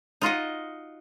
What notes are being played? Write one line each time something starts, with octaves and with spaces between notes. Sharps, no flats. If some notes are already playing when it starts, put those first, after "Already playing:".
D#4 F4 F#4 D#5